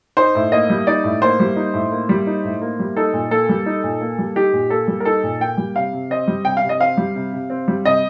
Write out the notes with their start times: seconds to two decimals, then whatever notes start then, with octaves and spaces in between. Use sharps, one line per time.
0.17 D#4 C5
0.35 A2
0.52 A#3 D#5
0.70 G3
0.87 D#4 D5
1.04 A2
1.22 A#3 C5
1.40 G3
1.56 D#4
1.74 A2
1.92 A#3
2.09 G3
2.27 D#4
2.44 A2
2.62 A#3
2.80 G3
2.96 D#4 A4
3.13 A#2
3.31 A#3 A4
3.49 G3
3.66 D#4
3.83 A#2
4.01 A#3
4.19 G3
4.36 D#4 G4
4.53 A#2
4.70 A#3 A4
4.88 G3
5.00 A#4
5.05 D#4 A4
5.23 A#2
5.40 A#3 G5
5.57 G3
5.76 C3 F5
5.93 C3
6.10 C4 D#5
6.27 G3
6.45 C3 G5
6.57 F5
6.62 C3
6.69 D#5
6.80 C4 F5
6.97 G3
7.15 C3
7.33 C3
7.50 C4
7.68 G3
7.85 C3 D#5